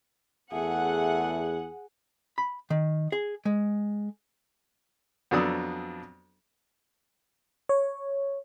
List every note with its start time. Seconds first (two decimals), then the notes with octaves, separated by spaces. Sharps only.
0.52 E2 A3 G#4 F#5
2.38 B5
2.70 D#3
3.12 G#4
3.45 G#3
5.31 F2 F#3 B3 D4 D#6 E6
7.69 C#5